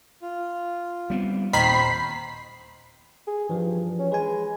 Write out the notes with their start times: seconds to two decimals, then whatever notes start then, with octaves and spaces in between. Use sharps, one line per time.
0.22 F4
1.10 G3 B3 C4
1.53 D#2 A#2 D#3 C5 B5 B6 C7
3.27 G#4
3.49 G2 E3 F3
3.99 C#4
4.12 G#3 B4 G#5